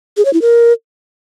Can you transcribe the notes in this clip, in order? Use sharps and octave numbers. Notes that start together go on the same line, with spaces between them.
G#4
C#5
E4
A#4